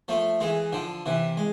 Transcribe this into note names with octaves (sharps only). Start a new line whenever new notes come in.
F3 A3
E3 G#3
D3 F3
C3 E3
G#3